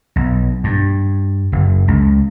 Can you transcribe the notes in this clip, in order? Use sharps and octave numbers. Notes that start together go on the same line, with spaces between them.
B1
G2
F#1
C#2